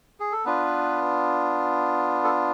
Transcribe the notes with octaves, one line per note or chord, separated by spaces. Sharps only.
G#4
A4
B3 D4 F4 B4
A4